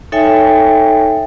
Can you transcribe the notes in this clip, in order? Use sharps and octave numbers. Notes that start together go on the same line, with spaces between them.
D#4 A4 C#5 E5 G5 G#5